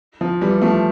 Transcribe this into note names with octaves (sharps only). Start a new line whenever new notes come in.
F3
E3 G3
F3 A3